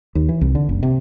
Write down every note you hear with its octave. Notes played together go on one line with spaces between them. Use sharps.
D#2
E3
C2
D3
F#1
C3